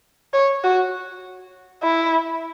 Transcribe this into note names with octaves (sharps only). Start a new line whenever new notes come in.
C#5
F#4
E4